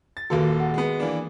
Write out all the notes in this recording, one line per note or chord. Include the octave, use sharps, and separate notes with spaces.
A6
D#1 D#3 A#3 F#4 A4
F#5
G#3 B3
E3 A#3 D4